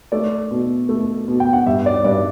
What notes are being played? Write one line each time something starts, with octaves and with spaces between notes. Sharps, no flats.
A3 D5
B2
A3
B2
G5
F#5
G2 E5
D5
G2 D5